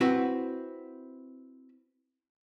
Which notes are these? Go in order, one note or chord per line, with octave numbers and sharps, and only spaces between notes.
C4 E4 F#4 B4